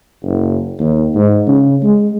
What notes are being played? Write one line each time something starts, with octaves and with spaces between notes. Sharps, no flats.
F#1
D#2
G#2
C#3
G#3